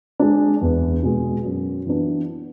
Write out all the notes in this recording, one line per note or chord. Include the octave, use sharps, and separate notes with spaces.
G#3 D4
E2
B2 G#3
F#2
E3 B3 D4